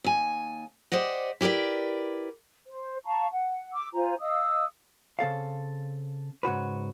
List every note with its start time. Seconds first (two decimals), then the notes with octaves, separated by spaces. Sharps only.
0.04 D#2 G#5
0.92 G4 C5 D5 D#5 F#5
1.41 E4 G4 A#4 B4 D5
2.67 C5
3.05 F5 A5 A#5 C#6
3.31 F#5
3.73 D6 E6
3.94 F4 C5 G#5 A#5
4.20 D#5 F5 D#6 E6
5.19 C#3 C4 A4 F5
6.43 G#2 C#3 F#4 B4